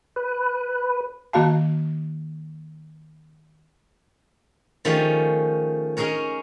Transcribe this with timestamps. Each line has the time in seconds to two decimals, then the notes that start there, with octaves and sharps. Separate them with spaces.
0.16 B4
1.33 D#3 A#3 F#4 F5 A5
4.85 D#3 F3 A3 C#4 G4 G#4
5.97 C#4 D#4 G#4 A#4 C#5